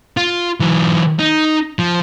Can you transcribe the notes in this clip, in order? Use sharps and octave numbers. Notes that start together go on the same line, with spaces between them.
F4
E3 F#3
D#4
F3